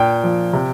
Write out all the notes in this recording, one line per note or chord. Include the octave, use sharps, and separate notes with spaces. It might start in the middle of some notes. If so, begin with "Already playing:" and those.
Already playing: A#2 G5
F3
C3